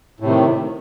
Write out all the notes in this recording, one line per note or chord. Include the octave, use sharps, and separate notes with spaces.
A2 C3 D#3